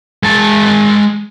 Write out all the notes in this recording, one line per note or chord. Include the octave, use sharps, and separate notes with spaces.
G#3 A5